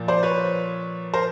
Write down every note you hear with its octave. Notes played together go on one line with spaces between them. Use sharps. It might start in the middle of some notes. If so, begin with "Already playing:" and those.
Already playing: A#2 F3
C5 D5
B4 C#5
A#4 C5